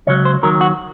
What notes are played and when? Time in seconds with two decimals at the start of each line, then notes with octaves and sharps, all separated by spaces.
0.07 C#2 C#3 F#3 C#5
0.25 C5
0.43 D#2 D#3 F#3 A#4
0.61 F#4